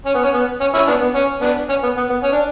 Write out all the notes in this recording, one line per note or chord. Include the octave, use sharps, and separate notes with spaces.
C#4
B3
C#4
B3
C#4
C#4 E4
B3 D4
B3
C#4
B3 D4
C#4
B3
B3
B3
C#4
D4